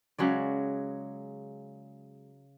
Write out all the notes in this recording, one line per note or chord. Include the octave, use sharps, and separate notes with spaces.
C#3 F#3 G#3 D5